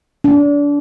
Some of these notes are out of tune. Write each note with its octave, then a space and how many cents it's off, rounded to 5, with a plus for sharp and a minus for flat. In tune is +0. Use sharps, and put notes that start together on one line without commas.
D4 -30